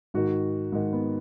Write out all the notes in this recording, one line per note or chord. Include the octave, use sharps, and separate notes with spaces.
G#2 D#3 F#4
G#2 D#3
B3